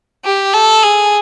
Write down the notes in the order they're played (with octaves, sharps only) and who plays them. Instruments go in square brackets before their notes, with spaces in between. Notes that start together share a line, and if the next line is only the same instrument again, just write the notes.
[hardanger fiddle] G4
A4
G#4